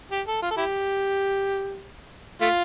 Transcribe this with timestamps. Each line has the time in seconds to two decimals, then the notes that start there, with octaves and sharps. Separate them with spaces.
0.11 G4
0.28 A4
0.42 F4
0.51 A4
0.57 E4 G4
2.41 A3 F4